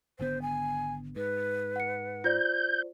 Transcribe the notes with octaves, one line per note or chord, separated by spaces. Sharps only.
G#1 D3 B3 C5
G#5
G#2 B4
F#5 C#7
F4 C5 D5 G6